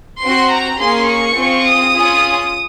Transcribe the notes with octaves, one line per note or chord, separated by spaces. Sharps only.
C4 F#4 C6
A#5
A#3 C#4 G#4 C6
C#6
C4 F4 G#4
D#6
C#4 F4 G#4